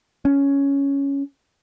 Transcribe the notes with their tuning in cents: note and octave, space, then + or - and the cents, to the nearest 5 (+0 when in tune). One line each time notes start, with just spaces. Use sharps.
C#4 +5